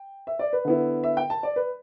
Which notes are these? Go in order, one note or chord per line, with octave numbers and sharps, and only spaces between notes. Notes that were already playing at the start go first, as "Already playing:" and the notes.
Already playing: G5
E5
D5
B4
D3 B3 E4
E5
G5
A5
D5
B4